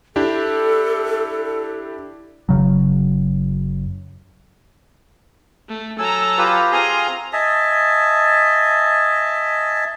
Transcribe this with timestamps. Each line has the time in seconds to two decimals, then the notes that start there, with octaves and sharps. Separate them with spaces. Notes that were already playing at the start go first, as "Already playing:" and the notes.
0.16 D4 E4 G4 A4
2.49 F#1 C#3 F#3
5.68 A3
5.99 F#3 A4 G#5 A#5 E6
6.38 F4 G4 B4
6.72 C4 F4 G#4 G#5 A#5 C6 D#6
7.33 D#5 E5 G#5 A5